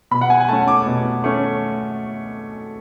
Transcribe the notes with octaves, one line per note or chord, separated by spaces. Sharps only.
B2 B5
F#5
G#5
G#5
A3 C#4 A5
D6
B2
A3 C#4